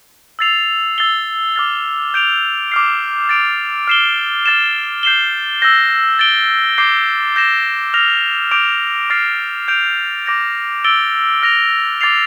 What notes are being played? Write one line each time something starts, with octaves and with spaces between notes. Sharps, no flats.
E6 A6 C7 F7
E6 A6 C7 G7
D6 F6 A6
G6 D7 F7
D6 F6 C7
A6 D7 F7
F6 C7 E7 G7
F6 A6 E7
G6 C7 E7 G7
E6 G6 A#6
A6 D7 G7
D6 G6 C7
G6 A#6 E7
F6 A#6 F7
D6 G6 D7 F7
D6 F6 A6 C7
G6 D7 F7
D6 G6 A#6 D7
E6 A6 D7 G7
F6 A#6 F7
D6 A6 C7 F7